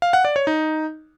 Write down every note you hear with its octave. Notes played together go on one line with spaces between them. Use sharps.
F5
F#5
D5
C#5
D#4